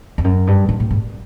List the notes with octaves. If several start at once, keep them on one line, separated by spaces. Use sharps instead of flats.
F2
F#2
G2
G#2
A2
G#2